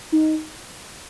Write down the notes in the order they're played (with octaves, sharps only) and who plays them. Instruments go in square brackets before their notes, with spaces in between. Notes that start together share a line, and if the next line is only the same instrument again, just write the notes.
[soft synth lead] D#4